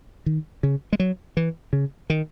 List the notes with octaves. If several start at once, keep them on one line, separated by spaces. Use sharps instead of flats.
D#3
C#3
G#3
F#3
E3
C#3
D#3